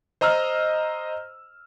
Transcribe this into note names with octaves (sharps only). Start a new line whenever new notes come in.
C5 D#5 A#5 E6 F6